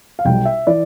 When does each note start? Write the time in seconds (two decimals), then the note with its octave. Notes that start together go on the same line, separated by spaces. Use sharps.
0.19 F5
0.25 B1 B2 G3 G5
0.45 E5
0.67 E3 D5